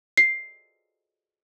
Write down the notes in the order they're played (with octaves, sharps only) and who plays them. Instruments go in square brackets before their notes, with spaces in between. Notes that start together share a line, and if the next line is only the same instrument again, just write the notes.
[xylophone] C7